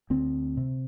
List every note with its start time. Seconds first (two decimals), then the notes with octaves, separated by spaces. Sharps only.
0.10 D2 C4
0.57 C3